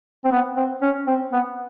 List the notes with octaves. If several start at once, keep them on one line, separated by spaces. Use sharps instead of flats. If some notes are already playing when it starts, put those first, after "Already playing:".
C4
B3
C4
C#4
C4
B3